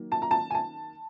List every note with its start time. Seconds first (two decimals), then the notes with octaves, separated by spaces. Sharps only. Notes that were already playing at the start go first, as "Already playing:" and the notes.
Already playing: D#3 F#3 A#3
0.12 A5
0.22 A#5
0.31 A5
0.50 G#5
0.55 A5